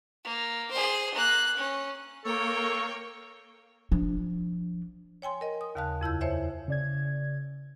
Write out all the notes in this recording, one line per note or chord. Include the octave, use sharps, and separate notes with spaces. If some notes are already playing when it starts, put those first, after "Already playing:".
A#3
G#4 C5
A#3 F#6
C#4
A#3 A4 C#5 G5 C#6
F3 D4
C#5 G5 G#5 C6
A#4 D#5
D#6
D#2 C#3 F5 A5 F#6
F2 E4 E6 G6
C5 C#5 E5 G#5
C#3 D5 G#6